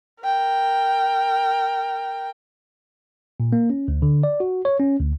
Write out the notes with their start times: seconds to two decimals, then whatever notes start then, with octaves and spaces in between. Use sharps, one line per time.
0.24 A#4 G5
3.40 A#2
3.53 A#3
3.70 C#4
3.88 D2
4.02 D3
4.23 D5
4.40 F#4
4.65 C#5
4.80 C#4
4.99 D2